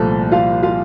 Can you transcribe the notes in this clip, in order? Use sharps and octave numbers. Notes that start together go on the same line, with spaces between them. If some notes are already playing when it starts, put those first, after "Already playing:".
Already playing: C2 A#2 F3 A3 A4
F4 F5
F4 F5